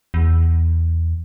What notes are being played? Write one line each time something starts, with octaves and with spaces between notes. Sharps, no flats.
E2